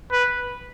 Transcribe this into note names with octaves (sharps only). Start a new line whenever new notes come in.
B4